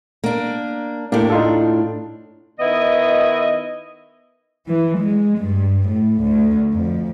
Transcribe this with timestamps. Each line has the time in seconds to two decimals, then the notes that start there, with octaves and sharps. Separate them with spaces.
0.24 A#3 D4
1.12 A2 A#3 D4 G4
1.30 D#4 F4 A4
2.60 D#3 B3 E4 D#5
4.68 E3
4.99 G#3
5.39 G2
5.90 A2
6.23 D2
6.74 F2